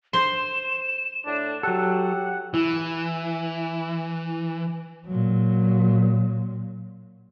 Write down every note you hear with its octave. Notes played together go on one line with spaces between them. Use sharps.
C5 C6 E7
A2 D4
F#3 G4 A4 F#5
E3 E4
A#2 F#3